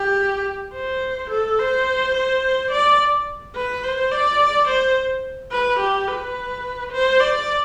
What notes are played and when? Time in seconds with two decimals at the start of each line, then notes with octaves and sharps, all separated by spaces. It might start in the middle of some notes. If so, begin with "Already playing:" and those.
Already playing: G4
0.74 C5
1.30 A4
1.59 C5
2.15 C5
2.72 D5
3.56 B4
3.83 C5
4.12 D5
4.68 C5
5.52 B4
5.80 G4
6.08 B4
6.92 C5
7.20 D5